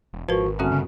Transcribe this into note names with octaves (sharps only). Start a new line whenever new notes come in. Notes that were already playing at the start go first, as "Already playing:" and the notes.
E1
G#1 F3 F#4 A#4 B4
G1 A3 C4 C#4 F#4 F#5
C#3